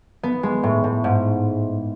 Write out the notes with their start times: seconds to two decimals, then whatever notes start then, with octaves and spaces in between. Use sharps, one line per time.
0.23 B3
0.43 G#3
0.63 A2
0.84 A2
1.04 G#2